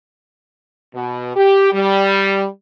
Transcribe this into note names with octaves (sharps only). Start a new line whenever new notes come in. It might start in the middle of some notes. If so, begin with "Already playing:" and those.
B2
G4
G3